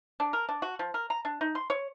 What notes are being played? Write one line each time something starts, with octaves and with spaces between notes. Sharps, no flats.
D4
A#4
D4
F#4
F3
A#4
A#5
D4
D#4
C6
C#5